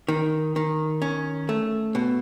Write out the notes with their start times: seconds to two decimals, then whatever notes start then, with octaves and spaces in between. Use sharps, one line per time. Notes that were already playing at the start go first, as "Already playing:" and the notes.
0.08 D#3
0.56 D#3
1.02 C#4
1.49 A3
1.95 B2